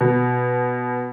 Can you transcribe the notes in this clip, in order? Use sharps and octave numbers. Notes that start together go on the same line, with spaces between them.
B2